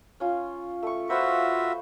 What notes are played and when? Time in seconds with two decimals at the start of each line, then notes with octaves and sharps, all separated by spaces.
0.20 C#4 F4
0.83 A3 C#6
1.09 F4 F#4 B4 C5 E5 C#6